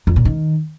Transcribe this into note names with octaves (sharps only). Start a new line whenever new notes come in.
F2
A#2
D#3